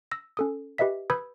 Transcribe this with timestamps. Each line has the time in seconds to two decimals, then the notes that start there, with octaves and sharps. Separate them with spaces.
0.11 E6 A#6
0.37 C#4 A4 D#6
0.78 G4 B4 D#5 E5 B6
1.10 B4 B5 D#6 E6 G6 G#6